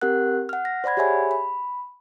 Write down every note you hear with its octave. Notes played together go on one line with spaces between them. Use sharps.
C4 G4 A#4 F#5 F#6
F#5 F6
A#6
C5 D5 F#5 B5 G#6
G4 G#4 C#5 E5 G#5 B5
B5